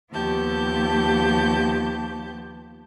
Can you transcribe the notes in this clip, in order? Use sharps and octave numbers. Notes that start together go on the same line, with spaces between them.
D#2 F3 B3 G4 A5 G6